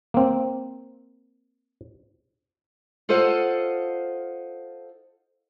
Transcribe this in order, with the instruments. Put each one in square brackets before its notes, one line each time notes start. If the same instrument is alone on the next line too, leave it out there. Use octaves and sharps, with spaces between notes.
[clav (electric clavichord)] A#3 C4
[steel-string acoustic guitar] F4 A4 C5 D#5 F5 F#5